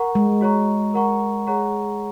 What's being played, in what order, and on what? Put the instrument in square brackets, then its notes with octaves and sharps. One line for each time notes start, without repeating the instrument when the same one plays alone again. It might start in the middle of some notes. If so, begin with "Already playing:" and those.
Already playing: [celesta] A#4 F#5 A#5 C#6
[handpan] G#3
[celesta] F#4 C#5 A#5 C#6
A#4 F#5 A#5 C#6
G#4 C#5 F#5 A#5 C#6